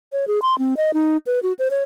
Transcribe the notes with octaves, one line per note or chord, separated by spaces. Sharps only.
C#5
G#4
C6
C4
D#5
D#4
B4
F#4
C5
C#5